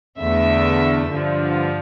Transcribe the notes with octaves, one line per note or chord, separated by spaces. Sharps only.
E2 D3 A3 E5
G2 D3 F3